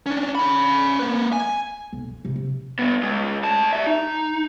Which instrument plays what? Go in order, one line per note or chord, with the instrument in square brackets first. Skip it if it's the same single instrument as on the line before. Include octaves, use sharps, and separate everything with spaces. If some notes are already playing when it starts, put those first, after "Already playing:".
[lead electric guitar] C#4 D4
C#4 B5
A#3 B4
G#5
[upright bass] B1
E3
C3 E3
C3
[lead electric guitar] G3 B3
C#3 G#3
D2 A5
G3 E5
D#4